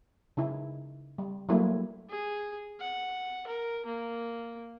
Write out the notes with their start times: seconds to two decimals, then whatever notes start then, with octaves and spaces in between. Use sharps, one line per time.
0.37 C#3 D#4 E4
1.18 G3
1.49 F#3 G3 A3 A#3 E4
2.10 G#4
2.80 F#5
3.47 A#4
3.86 A#3